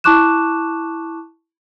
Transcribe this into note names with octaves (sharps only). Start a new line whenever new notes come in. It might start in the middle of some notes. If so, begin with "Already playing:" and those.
E4 A5 C#6 D6 F#6 E7